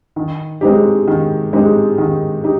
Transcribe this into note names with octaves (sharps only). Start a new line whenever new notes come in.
D#3
G#3 C4 D#4 G4
D#3
G#3 C4 D#4 G4
D#3
D#4 G4